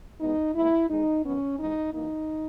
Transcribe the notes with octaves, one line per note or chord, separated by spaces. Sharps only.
E2 B2 G#3 B3 D#4
G#2 E3 A#3 E4
E2 D#3 G#3 D#4
F#2 D#3 F#3 B3 C#4
G#2 E3 G#3 D#4
F#2 E3 A#3 D#4